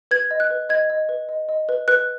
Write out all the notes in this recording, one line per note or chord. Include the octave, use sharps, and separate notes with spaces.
B4 G#6
D#5
F#6
B4
D#5 G#6
D#5
B4
D#5
D#5
B4
B4 F#6